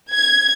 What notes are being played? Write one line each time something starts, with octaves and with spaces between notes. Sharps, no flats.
G#6